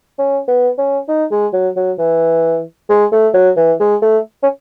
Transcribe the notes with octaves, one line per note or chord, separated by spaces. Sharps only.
C#4
B3
C#4
D#4
G#3
F#3
F#3
E3
G#3
A3
F#3
E3
G#3
A3
C#4